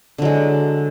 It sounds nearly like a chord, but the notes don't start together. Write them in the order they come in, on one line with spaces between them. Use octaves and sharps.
D3 F#3 G#3